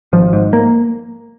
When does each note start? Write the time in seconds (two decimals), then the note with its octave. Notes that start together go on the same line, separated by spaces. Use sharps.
0.13 G#1 F3
0.33 G#2
0.53 A#3